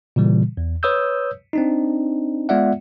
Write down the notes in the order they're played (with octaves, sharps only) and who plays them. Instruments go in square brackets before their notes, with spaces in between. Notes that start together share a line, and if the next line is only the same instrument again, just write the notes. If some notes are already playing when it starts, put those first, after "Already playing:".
[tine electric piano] A#2 C#3 E3 G3
E2
B4 C#5 D#6 E6 G6
C4 D4 D#4
G#3 B3 F4 D5 E5 F#5